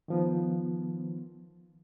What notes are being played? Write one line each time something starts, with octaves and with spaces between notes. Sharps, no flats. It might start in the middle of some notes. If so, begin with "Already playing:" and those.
D#3 F3 B3